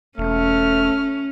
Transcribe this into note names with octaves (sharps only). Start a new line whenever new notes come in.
E1 A3 C#4 F6